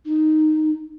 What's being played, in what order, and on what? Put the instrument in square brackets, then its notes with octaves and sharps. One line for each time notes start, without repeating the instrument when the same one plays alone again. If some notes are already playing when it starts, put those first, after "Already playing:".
[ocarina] D#4